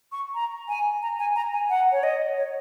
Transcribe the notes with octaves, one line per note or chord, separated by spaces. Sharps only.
C#6
A#5
G#5
A#5
G#5
A#5
G#5
F#5
C#5
D#5
C#5